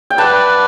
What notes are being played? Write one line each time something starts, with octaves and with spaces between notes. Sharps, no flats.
G5
B4 D5 F#5 A5